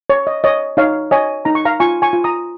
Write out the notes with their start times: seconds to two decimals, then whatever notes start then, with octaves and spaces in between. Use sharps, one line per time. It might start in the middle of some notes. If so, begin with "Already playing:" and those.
0.10 C#5
0.27 D#5
0.44 C#5 D#5
0.77 D#4 C#5 F5
1.11 C#5 D#5 G#5
1.45 D#4 A#5
1.55 C#6
1.65 F5 A#5
1.80 F4 G#5 C#6
2.02 G#5 C#6
2.13 F4
2.24 A#5 D#6